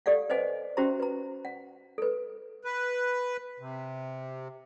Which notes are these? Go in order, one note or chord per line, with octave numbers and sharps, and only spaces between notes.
G4 A4 D5 F5 F#5
B4 C5 D#5 F#5 G#5
C#4 F#4 G4 C5 E5 A#5
B4 A#5
F#5
A4 B4
B4
C3